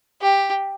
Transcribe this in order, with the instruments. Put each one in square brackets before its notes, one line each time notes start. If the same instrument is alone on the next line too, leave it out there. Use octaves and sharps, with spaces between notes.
[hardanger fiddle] G4